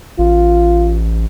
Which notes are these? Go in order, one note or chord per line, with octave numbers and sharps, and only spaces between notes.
A1 F4